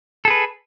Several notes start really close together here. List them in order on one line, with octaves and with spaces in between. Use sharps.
A4 G#4 B4